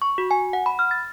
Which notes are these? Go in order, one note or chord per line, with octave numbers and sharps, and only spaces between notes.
C#6
F#4
G#5
F#5
B5
F6
A6